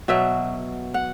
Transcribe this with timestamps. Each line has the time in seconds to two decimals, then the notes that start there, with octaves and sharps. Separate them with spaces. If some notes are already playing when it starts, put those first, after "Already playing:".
0.08 B2 F#3 E5
0.94 F#5